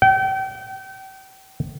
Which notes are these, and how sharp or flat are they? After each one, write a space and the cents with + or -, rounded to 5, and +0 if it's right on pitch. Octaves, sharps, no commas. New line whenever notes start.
G5 -35